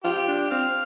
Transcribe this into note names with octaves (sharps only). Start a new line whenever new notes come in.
F4 G4
D4
C4 F5